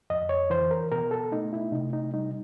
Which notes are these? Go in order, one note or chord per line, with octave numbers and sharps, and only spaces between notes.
F2 D#5
C#5
E3 C5
A#4
B2 A#4
A4
A3 D#4
E4
C3 D#4
D#4
G3 D#4